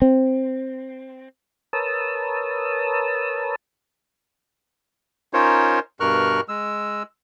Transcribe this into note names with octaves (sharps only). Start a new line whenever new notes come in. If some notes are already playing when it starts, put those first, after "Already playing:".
C4
A#4 B4 C#5 A5 D#6 E6
C#4 D#4 F4 A#4 C5 C#5
G2 B2 A#4 C#6 F6 F#6
G#3 E6